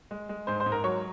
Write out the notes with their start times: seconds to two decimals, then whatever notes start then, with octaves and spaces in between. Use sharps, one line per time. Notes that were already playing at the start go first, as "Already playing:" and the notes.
0.11 G#3
0.29 G#3
0.47 G#2 C5 C6
0.60 C5 C6
0.66 G#2
0.72 A#4 A#5
0.84 F#3 C#5 C#6